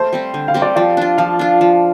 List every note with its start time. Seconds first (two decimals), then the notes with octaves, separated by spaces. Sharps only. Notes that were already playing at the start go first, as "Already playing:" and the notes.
Already playing: A3 C5
0.13 G3 C4 G4
0.34 D3
0.48 F5
0.54 G3 C4 G4
0.62 D5
0.76 F3 D5
0.97 D4 F4
1.18 F3 F5
1.39 D4 F4
1.61 F3